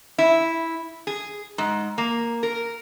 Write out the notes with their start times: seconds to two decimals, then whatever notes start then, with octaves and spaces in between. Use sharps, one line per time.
0.18 E4
1.07 G#4
1.58 G#2
1.98 A#3
2.43 A#4